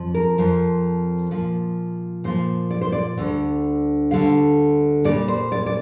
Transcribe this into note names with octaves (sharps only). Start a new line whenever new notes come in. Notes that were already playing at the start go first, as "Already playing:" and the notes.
Already playing: F2 F3
A#4
F2 F3
A#2 F3
A#2 F3 C5
D5
C5
D5
D2 D3 G3
D2 D3 G3 F5
A#2 G3 D5
C5
D5
D5